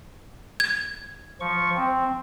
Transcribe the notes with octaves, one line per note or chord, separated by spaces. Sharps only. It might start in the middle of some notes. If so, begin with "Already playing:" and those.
G#6
F3 C#6
C4